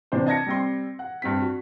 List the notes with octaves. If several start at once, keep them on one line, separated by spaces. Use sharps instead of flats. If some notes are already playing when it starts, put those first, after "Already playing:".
C3 E3 D4 C5
D#5 A5 G#6 A#6 C#7
G3 C4 C6
F#5
G2 C4 B6
F#4